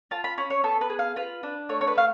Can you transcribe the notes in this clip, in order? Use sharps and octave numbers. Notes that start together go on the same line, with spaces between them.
F4 A5
B5
C#4 B5
C#5
B3 A4
B4
G#4
F5
F4 B4
D4
A3 C#5
C#5
B4
A3 F5